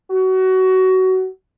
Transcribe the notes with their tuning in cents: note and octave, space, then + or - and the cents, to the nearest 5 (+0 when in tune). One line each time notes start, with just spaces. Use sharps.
F#4 +20